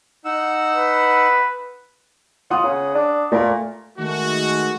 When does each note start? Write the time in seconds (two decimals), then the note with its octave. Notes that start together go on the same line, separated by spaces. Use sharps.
0.25 D#4 F#5 E6
0.73 B4
2.51 F4 F#5 D#6
2.64 C#3
2.94 D4
3.32 A#2 A3 A#4
3.98 D#3 G#3 A3 F#4